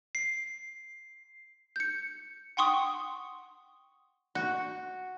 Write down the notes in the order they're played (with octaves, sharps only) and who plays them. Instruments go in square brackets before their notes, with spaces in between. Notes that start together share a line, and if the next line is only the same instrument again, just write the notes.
[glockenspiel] C7
[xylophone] G6 C#7
F#5 G5 C6 C#6 D#6
[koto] F#4